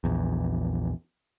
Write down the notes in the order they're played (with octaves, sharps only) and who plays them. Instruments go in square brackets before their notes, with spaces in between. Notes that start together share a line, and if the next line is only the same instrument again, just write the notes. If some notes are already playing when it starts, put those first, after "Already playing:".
[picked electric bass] A#1 E2